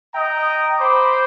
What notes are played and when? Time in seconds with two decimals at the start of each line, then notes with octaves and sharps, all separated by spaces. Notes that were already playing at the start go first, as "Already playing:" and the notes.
0.14 D#5 G5 A#5
0.78 C5 B5 D6